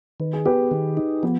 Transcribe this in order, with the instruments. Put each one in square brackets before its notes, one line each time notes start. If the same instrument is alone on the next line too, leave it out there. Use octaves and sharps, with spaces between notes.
[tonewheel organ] D#3 [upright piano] B4
[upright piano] G#4
[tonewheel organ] B3 [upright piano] G4 B4
[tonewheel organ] D#3
D#4
[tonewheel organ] F3 [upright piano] B3